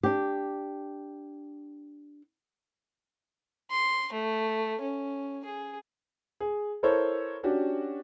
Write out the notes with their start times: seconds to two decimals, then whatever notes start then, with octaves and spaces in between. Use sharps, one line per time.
0.03 D4 G4
3.71 C6
4.13 A3
4.82 C#4
5.45 G#4
6.40 G#4
6.83 E4 A4 A#4 C5 C#5
7.43 C#4 D4 F#4 G4